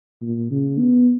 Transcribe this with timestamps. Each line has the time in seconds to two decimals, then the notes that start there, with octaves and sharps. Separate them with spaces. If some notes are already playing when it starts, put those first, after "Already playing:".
0.22 A#2
0.51 C#3
0.79 B3